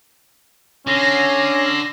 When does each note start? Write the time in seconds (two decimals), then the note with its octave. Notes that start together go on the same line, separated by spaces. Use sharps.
0.87 D3 C#4 A#6 C7